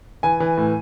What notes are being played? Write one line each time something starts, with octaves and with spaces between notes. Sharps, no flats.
E3 G#5
E3
A2